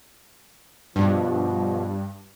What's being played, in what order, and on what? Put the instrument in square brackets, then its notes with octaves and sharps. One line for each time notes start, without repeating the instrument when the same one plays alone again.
[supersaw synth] G2 [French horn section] B2 F3